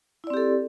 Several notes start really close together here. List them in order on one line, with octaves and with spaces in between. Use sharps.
E4 D5 C4 G4 A4